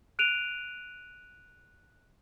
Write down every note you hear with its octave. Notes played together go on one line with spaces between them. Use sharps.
F#6 D7 D#7 F7